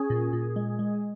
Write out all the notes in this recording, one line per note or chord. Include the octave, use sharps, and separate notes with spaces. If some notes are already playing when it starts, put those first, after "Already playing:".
Already playing: C#4 G#4
A#2
A#2
G#3
G#3